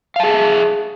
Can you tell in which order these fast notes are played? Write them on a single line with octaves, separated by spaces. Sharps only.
F5 A5 G#4 E5